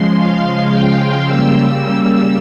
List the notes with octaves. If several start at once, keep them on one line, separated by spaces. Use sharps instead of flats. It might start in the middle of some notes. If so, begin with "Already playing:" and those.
Already playing: C#3 F3 G#3 C6
F5
G5
C#3 G3 A#3 E6